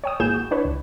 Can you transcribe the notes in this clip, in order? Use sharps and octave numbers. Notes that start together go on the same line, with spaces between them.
C#5 G5 D#6
G#1 A#3 E4 G#4 G6 E7
F#4
D4 E4 B4 C#5
C#2